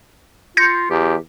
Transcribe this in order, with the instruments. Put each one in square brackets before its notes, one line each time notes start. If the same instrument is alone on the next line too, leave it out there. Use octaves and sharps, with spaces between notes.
[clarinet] F4 [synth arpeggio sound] G6 A#6 C#7
[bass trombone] E2 [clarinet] G4